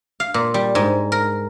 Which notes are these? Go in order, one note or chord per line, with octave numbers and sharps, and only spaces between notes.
F5
A#2
G3
G#2
A#4